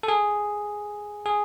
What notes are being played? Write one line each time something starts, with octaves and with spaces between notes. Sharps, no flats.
A4
G#4
G#4